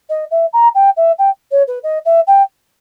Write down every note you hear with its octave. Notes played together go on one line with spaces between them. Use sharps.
D#5
E5
A#5
G5
E5
G5
C#5
B4
D#5
E5
G5